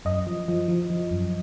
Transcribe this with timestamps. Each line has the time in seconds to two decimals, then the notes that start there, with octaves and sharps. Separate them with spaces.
0.05 F#2 D#5
0.27 F3
0.48 F3
0.68 F3
0.90 F3
1.11 F#2